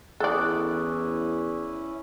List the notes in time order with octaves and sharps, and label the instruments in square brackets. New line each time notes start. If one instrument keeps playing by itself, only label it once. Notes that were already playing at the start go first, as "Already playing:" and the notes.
[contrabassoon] E2 [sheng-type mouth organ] C#4 E4 [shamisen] A4 D5 [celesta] D6 D#6 F#6